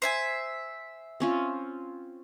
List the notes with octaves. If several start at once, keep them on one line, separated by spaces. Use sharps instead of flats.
C5 E5 G#5
C4 C#4 F4